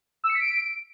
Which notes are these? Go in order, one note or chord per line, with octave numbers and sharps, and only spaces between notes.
E6
C#7
B6
D7